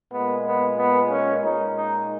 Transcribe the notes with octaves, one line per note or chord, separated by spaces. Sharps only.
A#2 G#3 B3
B3
B3
C#4
A#2 G#3 D#4
D#4